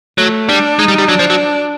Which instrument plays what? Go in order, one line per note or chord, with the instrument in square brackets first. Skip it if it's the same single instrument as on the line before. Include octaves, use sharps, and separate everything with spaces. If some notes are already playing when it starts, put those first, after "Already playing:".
[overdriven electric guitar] F#3 [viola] A3
[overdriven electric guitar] G3 [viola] D4
[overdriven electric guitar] G#3 [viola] D#4
[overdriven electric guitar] G3
G3
[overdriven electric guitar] F#3 [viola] D4
[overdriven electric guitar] F3
F#3